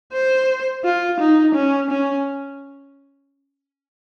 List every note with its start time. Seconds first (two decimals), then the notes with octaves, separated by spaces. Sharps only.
0.13 C5
0.84 F4
1.20 D#4
1.55 C#4
1.90 C#4